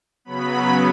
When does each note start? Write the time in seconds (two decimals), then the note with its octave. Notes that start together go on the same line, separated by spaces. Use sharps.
0.25 C#3 F#3 B3 B5